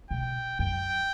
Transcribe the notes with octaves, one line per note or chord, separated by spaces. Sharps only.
B2 G5
F#2 G5